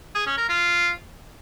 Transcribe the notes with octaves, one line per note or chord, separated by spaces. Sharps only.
G#4
C#4
A#4
F4